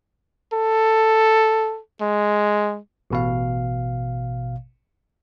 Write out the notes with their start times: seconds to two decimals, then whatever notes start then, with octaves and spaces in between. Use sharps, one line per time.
0.53 A4
2.02 G#3
3.10 A1 B2 F5